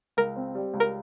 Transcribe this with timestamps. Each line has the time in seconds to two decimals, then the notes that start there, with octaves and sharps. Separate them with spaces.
0.17 C#2 A#4
0.36 C4
0.55 G3
0.74 C#2
0.80 A#4